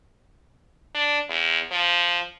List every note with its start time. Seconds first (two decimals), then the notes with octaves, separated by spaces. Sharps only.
0.94 D4
1.29 E2
1.71 F3